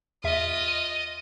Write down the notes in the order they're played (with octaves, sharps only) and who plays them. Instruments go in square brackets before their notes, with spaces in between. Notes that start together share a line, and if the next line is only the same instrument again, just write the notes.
[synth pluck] E2 E5 [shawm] F4 [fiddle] D#5